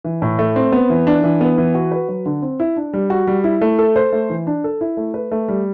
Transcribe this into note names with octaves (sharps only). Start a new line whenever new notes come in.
E3
A2
A3
C4
B3
E3
D4
E3
B3
E3
F#4
B4
F#3
D3
C4
E4
D4
G3
F#4
G3
E4
A3
A4
C5
A3
E3
D4
A4
E4
A3
B4
A3
G3